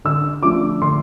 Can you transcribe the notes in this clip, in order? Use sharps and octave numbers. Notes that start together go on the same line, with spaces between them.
D3 E6
F3 A3 D4 D6
D3 C6